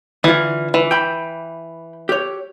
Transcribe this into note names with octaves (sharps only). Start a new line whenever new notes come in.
D3 E3 F4
E3
G5 B5
G4 C#5